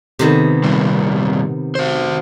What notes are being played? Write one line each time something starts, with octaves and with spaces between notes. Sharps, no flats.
C3 D#3 B3
A#2 G3 C4
F#4 C5